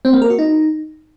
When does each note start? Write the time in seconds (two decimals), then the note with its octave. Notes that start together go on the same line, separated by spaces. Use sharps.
0.05 C4
0.13 A#3
0.22 A#4
0.30 F#4
0.39 D#4